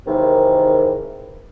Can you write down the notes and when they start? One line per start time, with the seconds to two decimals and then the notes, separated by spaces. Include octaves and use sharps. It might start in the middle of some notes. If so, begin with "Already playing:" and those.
0.07 D#2 G#2 C3 D#3 E3